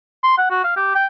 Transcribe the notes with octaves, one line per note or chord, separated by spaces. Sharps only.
C6
F#5
F#4
F5
G4
G5